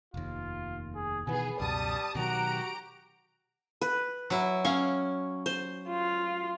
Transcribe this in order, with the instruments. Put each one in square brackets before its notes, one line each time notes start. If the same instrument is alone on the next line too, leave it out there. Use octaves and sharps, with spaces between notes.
[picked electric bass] F1 D#2 [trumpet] F4
[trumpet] G#4
[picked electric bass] B2 D#3 E3 [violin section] B3 G#4 [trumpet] G#5
[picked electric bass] C#2 F#2 B2 [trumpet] G3 [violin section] A5 D#6
[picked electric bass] B2 D#3 F#3 [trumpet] F#4 [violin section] G4 A#5 D7
[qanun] B4
[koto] F#3 E4
[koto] C#4 [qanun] F5 C#6
[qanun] C5
[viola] F4